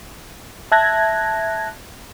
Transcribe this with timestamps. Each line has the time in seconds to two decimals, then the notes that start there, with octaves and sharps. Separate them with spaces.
0.72 E5 A5 F#6 G#6 A#6